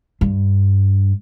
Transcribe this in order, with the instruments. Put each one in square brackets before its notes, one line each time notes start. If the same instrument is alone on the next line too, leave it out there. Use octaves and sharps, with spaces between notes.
[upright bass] G2